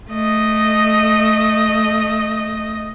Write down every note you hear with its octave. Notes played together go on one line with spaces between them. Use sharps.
A3 D#5